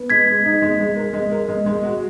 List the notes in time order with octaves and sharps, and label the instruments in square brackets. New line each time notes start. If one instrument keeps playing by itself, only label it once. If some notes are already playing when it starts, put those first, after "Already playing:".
Already playing: [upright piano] B3
[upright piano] G#3 [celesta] G#6 B6
[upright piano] G#3
D#4
G#3
G#3
A#4
G#3
A#4
G#3
G#3
F#4